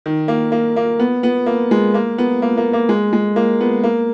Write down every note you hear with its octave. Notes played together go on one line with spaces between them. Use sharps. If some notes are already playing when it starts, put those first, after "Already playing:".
D#3
A#3
A#3
A#3
B3
B3
A#3
G#3
A#3
B3
A#3
A#3
A#3
G#3
G#3
A#3
B3
A#3